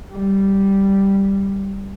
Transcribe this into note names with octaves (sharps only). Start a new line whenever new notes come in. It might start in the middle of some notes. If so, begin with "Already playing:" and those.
G3